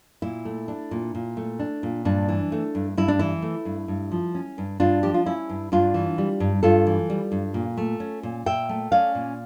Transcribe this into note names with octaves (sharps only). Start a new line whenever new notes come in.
A#2 E4
A3
D4
A#2
A#2
A3
D4
A#2
G2 D4
E3
A3
G2
G2 E4
D4
E3 E4
A3
G2
G2
F3
C#4
G2
G2 D4 F4
F3 G4
F4
C#4 E4
G2
G2 D4 F4
E3
G3
G2
G2 F4 A4
E3
G3
G2
A#2
A3
C#4
A#2
A#2 E5 G5
A3
C#4 D5 F5
A#2